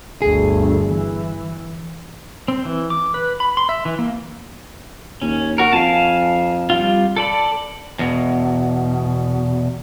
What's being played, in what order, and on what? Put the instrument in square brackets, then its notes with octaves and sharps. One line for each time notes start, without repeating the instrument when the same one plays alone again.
[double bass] G1 D2 [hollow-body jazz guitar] G#4
[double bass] E3
[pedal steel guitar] C4
E3
D6
B4
B5
C6
E5
E3
A#3
[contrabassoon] D#2 [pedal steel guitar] C#4
[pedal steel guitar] F#4 A#4
[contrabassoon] F2 [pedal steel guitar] F5 G#5 A5
[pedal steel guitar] G3 F4
A4 D5 B5
[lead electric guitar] E2 B2